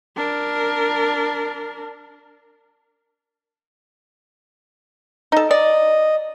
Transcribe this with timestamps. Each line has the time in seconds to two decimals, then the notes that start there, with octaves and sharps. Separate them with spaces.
0.17 D4 A#4
5.32 D#4 A4
5.51 D5 D#5